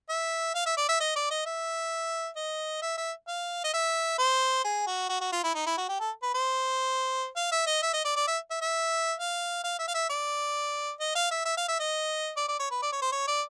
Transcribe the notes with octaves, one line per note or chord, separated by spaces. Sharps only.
E5
F5
E5
D5
E5
D#5
D5
D#5
E5
D#5
E5
E5
F5
D#5
E5
C5
G#4
F#4
F#4
F#4
F4
E4
D#4
E4
F#4
G4
A4
B4
C5
F5
E5
D#5
E5
D#5
D5
D5
E5
E5
E5
F5
F5
E5
F5
E5
D5
D#5
F5
E5
E5
F5
E5
D#5
D5
D5
C#5
B4
D5
C#5
C5
C#5
D5